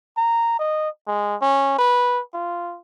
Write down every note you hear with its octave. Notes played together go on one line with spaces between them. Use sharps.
A#5
D#5
G#3
C#4
B4
F4